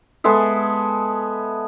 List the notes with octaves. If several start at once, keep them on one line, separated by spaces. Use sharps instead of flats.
G#3 B3 A4 E5